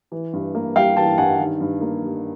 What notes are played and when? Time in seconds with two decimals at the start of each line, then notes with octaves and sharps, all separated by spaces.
0.12 E3
0.33 G2
0.55 A#3
0.76 G3 F5 G5
0.96 E3 G5 A5
1.18 G2 F#5 G#5
1.39 D#3
1.60 G2
1.81 A#3
2.02 G3